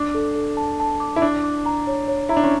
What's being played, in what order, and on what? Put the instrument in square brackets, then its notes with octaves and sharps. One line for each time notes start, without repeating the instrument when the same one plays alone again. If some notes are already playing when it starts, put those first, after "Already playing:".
Already playing: [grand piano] D4 [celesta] D6
[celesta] A4
A4
A5
A5
D6
[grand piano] E4
[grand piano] D4 [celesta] D6
[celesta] D6
A#5
C#5
C#5
[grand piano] E4 [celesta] A#5
[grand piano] D4
C#4